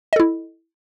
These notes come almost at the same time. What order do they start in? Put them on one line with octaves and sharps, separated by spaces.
D#5 A4 E4